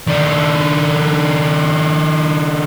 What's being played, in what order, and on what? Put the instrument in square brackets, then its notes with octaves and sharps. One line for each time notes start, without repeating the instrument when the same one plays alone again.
[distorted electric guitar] D#3 D4